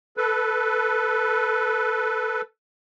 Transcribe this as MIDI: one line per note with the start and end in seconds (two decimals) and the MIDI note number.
0.17 2.41 69
0.17 2.41 71